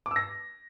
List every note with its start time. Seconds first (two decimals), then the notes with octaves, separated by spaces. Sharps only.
0.06 D6
0.11 E6
0.16 A#6